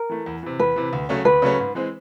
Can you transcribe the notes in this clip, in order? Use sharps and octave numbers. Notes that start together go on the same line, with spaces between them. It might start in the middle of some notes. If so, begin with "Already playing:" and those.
Already playing: A#4
E3 A3
E2
C3 E3
E2 B4
C3 E3
D2
C#3 F#3 A3 C#4
D2 B4
C#3 F#3 A3 C#4
G#2
E3 G#3 C4